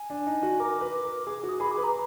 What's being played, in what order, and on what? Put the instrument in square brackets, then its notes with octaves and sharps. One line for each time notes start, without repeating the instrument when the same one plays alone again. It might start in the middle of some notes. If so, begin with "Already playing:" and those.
Already playing: [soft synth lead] G#5
[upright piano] D4
D#4
F#4
[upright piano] A#4 [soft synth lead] D6
[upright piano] B4
A#4
[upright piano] G#4 [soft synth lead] D6
[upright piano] F#4
[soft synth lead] D#6
[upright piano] G#4 [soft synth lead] B5
[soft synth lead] D6
[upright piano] B4
[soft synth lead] A#5